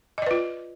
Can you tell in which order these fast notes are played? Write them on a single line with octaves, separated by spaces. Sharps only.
D#5 D5 B4 F4